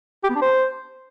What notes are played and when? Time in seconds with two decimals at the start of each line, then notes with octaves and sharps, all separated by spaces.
0.23 G4
0.29 B3
0.36 D4
0.42 C5